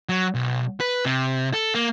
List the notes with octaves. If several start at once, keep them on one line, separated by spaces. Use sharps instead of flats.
F#3
B1
B4
C3
A4
A#3